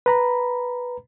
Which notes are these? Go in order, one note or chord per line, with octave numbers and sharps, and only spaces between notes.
B4 A#5 B5